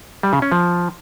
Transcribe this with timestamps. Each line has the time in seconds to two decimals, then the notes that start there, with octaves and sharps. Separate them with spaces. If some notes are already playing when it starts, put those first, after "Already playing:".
0.23 G3
0.33 C#3
0.42 C#4
0.52 F3